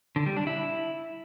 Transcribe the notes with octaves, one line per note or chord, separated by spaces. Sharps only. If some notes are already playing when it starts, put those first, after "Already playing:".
D3
G3
D4
E4